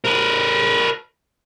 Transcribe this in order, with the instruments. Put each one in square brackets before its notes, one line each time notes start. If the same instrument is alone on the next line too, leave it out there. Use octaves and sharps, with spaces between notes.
[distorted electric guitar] A#4 B4